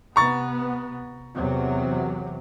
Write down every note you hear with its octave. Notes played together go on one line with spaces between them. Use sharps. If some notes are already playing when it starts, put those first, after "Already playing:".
C3 B3 A#5 C#6 A6
E2 C3 F#3